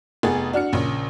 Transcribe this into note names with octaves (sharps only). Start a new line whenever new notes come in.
F1 B3 G#4 A6
D4 F#4 F6 C#7
A#1 C#3